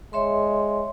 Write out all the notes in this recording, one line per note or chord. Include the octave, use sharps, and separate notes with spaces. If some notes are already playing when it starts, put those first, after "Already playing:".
G#3 C#5 E5 C6